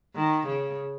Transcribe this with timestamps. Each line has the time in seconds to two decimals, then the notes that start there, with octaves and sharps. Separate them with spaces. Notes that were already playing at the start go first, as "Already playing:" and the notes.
0.15 D#3
0.46 C#3